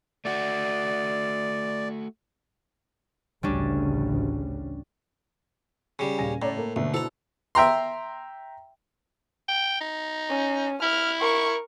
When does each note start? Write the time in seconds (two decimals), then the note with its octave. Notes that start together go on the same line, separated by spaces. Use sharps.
0.25 A3 F#4 D5
3.43 A1 D2 C#3 G3 C#4 D4
5.99 C#3 G3
6.18 D#1 F5 G#5 A#6
6.42 A2 C#3 C#5 D5 A#5
6.57 A#3 A4 A#4
6.76 D2 B2 A#3 D4 E5
6.94 E4 F#4 A4 C5 A#5
7.55 E5 G5 A#5 C6
9.49 G5
9.81 D#4
10.29 C#4
10.82 E4 F6
11.21 A#4 C#6